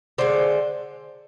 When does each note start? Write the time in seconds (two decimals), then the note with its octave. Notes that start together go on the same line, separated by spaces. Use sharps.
0.18 D3 G#3 C5